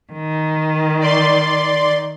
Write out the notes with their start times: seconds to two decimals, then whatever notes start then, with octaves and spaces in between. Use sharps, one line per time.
0.11 D#3
1.00 D5 C6